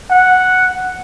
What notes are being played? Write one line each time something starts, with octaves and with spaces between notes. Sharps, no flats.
F#5